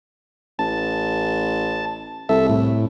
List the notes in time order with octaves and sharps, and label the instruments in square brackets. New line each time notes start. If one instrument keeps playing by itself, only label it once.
[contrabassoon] A1 [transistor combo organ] A5
[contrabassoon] C2 [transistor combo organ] A4 E5
[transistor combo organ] A2